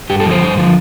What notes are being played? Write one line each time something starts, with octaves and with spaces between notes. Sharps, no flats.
G2 G4
A4
D3 F3
C5
G2
D3 F3